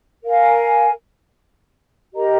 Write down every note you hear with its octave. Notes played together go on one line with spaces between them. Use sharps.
A#4 F5 G#5
G4 A#4 D#5 A#5